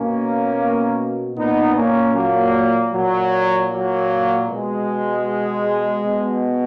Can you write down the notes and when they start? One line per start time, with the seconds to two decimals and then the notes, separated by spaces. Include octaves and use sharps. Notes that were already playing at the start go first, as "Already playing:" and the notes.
Already playing: B2 A#3 C#4
1.37 A#2 B3 D#4
1.76 A#3 C#4
2.15 F#3 A#3
2.93 A#2 F#3
3.71 F#3 A#3
4.49 B2 G#3
6.05 B2